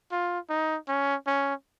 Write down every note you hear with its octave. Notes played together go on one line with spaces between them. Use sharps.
F4
D#4
C#4
C#4